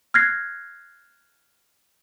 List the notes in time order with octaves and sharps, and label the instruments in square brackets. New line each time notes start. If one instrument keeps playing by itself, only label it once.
[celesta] F6 F#6 G#6 A#6 C7